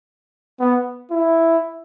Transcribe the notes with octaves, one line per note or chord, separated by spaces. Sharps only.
B3
E4